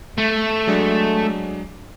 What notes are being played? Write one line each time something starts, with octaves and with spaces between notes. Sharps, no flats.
A3
F#3 G#3 D4